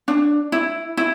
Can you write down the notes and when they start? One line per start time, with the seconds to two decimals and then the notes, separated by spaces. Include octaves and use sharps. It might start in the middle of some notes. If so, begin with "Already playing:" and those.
0.08 D4
0.52 E4
0.97 E4